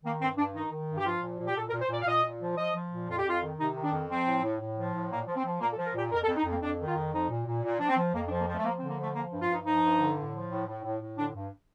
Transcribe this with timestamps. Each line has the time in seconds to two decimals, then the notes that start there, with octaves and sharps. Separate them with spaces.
0.04 D#3 A#3
0.21 G2 C4
0.38 G2 D4
0.54 D#3 D#4
0.71 D#3
0.89 G2
0.98 G4
1.05 F3 F4
1.22 A#2
1.39 A#2
1.46 G4
1.56 A#2 A4
1.69 A#4
1.73 A#2
1.81 C5
1.89 A#2 D5
2.02 F5
2.07 A#2 D#5
2.24 A#2
2.40 F3
2.57 F3 D#5
2.74 F3
2.91 A#2
3.08 F2 F4
3.18 G4
3.24 F2 F4
3.42 D#3
3.58 C3 D#4
3.75 D#3
3.84 D4
3.92 F2
4.09 F3 C4
4.26 A2
4.42 A2
4.59 A2
4.76 F3
4.93 A2
5.10 A#2 A#3
5.27 F3
5.36 C4
5.44 F3
5.60 A#2 A#3
5.73 A4
5.77 F3
5.86 A#4
5.95 A#2 G4
6.11 F2 A#4
6.24 A4
6.28 F2
6.36 D#4
6.45 F2
6.50 A#3
6.62 F2 D4
6.79 D#3
6.87 F4
6.96 F2
7.12 F3 D#4
7.30 A#2
7.46 A#2
7.63 A#2
7.78 F3 D4
7.89 C4
7.97 F3
8.14 F2 A#3
8.27 D4
8.30 F3
8.39 A#3
8.47 F3 A3
8.59 A3
8.64 F3 A#3
8.77 C4
8.81 D3
8.90 A#3
8.98 F3 A3
9.15 F3 A#3
9.32 G2
9.41 F4
9.48 G2 D#4
9.65 F3 D#4
9.83 G2
10.00 D3
10.16 A2
10.33 F3
10.50 A2
10.66 A2
10.83 A2
11.00 A2
11.17 D3 D4
11.35 G2